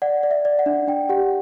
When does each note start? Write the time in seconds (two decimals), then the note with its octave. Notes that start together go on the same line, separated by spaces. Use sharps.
0.02 D5 F#5
0.23 D5
0.31 E5
0.45 D5
0.59 F#5
0.66 D4
0.87 D4 G5
1.09 G4 F#5